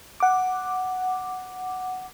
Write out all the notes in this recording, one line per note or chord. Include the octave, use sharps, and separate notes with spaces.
F#5 D6